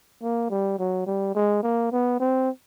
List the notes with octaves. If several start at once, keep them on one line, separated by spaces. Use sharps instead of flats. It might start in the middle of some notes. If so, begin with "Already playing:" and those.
A#3
G3
F#3
G3
G#3
A#3
B3
C4